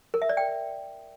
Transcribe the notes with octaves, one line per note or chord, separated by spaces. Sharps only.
A#4
E5
D5
G5